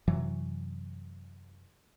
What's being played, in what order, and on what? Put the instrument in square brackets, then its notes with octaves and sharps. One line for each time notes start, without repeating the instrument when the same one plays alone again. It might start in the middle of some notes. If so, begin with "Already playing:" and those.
[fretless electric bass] F#2 C3 E3 F#3